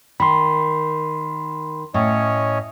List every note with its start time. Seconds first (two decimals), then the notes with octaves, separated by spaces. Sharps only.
0.20 D#3 B5 C6
1.94 A2 C#4 C#5 D#5